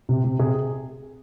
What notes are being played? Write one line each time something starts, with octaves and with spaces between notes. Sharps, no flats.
C3
C3
C3 G#4